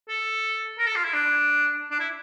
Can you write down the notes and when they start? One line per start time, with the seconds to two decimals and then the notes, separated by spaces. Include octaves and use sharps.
0.08 A4
0.78 A#4
0.87 A4
0.95 F4
1.04 E4
1.13 D4
1.91 D4
1.99 E4